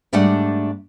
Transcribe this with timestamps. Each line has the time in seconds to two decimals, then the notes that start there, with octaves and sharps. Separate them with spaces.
0.13 G#2 G3 A3 D4 D5 F#5